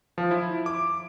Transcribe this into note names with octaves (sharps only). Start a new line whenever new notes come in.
F3
E4
D6